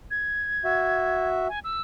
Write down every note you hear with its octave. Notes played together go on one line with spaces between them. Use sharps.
G#6
F#4 E5
G#5
E6